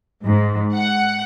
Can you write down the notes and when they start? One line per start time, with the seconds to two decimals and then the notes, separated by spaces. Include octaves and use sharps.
0.24 G#2
0.76 F#5